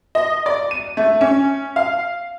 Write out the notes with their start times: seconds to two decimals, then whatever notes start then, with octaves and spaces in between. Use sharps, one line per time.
0.15 D#5
0.46 D5
0.71 D#7
0.97 A3
1.21 C#4
1.76 F5